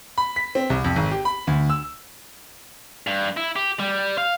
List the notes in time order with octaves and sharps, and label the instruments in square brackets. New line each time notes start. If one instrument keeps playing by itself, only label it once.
[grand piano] B5
B6
C4
C2
F2
G#1
G4
B5
D2
E6
[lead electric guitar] G2
E4
G4
G3
F5